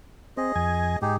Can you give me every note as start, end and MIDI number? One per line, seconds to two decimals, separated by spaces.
0.37 0.52 60
0.37 0.98 68
0.37 0.98 75
0.56 0.97 41
0.56 0.97 80
1.02 1.18 44
1.02 1.16 63
1.02 1.16 67
1.02 1.16 68